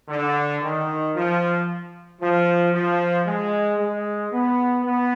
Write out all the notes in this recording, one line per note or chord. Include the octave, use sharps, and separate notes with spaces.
D3
D#3
F3
F3
F3
G#3
G#3
B3
B3